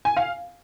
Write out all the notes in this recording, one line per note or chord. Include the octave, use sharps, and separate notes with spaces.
G#5
F5